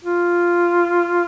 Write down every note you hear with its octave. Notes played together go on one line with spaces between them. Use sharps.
F4